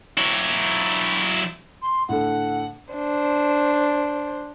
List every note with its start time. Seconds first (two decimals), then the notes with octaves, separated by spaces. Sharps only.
0.18 F#3 E4
1.82 C6
2.09 A2 D3 A4 F#5
2.94 D4 C5